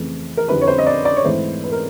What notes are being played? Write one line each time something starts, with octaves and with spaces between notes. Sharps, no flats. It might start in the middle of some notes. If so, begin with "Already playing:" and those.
Already playing: F2 C#3 E3 A3
A#4
F2 D3 G3 C4 E4 B4
C#5
C5
D#5
D5
D5
C#5
G#2 E3 A3 C4 E4 C5
B4
A#4